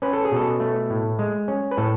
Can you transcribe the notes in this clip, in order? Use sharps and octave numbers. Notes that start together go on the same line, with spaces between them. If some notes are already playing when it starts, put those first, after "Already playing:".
C#4 B4
A4
G#4
B2 A4
A3
A2
G#3
C#4
B4
A2 A4